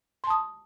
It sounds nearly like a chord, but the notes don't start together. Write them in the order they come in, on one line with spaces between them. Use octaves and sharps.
C6 A5 D#6